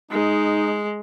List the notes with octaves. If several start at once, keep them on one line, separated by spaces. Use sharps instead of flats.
G#3 D#4